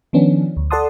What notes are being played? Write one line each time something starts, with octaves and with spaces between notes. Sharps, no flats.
D#3 F3 B3 C#4 D4
D2
A4 D5 F#5 A5 C6 D#6